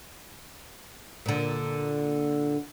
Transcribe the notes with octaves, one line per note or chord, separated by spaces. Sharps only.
A#2 D3